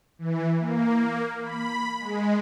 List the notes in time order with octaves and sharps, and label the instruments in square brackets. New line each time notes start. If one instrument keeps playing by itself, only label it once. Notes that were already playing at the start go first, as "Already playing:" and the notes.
[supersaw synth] E3
A#3
B5
G#3